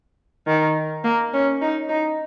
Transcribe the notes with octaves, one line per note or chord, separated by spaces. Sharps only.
D#3
A#3
C#4
D#4
D#4